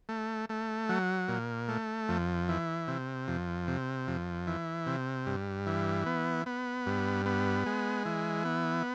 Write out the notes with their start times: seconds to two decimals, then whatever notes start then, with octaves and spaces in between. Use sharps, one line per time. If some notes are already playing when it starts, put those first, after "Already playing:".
0.09 A3
0.49 A3
0.89 F#3
1.28 A#2
1.68 A3
2.09 F2
2.49 E3
2.88 C3
3.28 F2
3.68 C3
4.07 F2
4.47 E3
4.87 C3
5.26 G2
5.66 E3
6.06 B3
6.46 B3
6.86 G2
7.26 B3
7.66 G#3
8.05 E3
8.45 B3